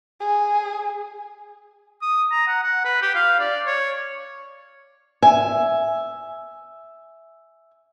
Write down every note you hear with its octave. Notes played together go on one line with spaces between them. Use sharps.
G#4
D#6
A#5
F#5
F#5
B4
G4
F5
D5
C#5
E5 G#5